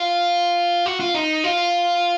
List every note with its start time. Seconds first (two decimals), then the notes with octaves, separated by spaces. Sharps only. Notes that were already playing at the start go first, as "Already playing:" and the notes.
Already playing: F4
0.86 F#4
1.00 F4
1.14 D#4
1.44 F4